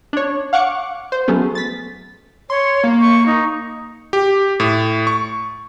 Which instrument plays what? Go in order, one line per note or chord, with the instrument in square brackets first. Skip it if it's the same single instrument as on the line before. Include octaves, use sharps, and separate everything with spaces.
[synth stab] D4 C#5
F5 F#5 C#6 D6 C#7
C5
F#3 G#3 A3 B3 C#4
A6 B6
[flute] C#5 [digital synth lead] C6
[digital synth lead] A#3
[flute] C#6
D#4
[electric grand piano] G4
A2
C#6